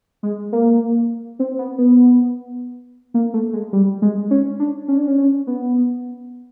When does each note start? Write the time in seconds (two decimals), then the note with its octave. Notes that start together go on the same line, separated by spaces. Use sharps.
0.23 G#3
0.52 A#3
1.39 C4
1.58 B3
1.78 B3
3.14 A#3
3.34 A3
3.53 G#3
3.73 G3
4.02 G#3
4.31 C#4
4.59 D4
4.88 C#4
4.98 D4
5.07 C#4
5.18 C#4
5.47 B3